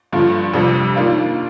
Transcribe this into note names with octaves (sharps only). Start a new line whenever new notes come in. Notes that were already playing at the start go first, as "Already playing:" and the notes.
G2 D3 F3
F2 C3 G3 D4
D#3 A#3 D4 F4